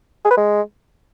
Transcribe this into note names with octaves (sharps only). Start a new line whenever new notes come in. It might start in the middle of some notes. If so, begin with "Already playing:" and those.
G#4
B4
G#3